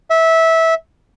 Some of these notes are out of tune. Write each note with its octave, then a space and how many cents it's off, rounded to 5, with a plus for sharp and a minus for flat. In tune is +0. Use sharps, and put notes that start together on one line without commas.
E5 -15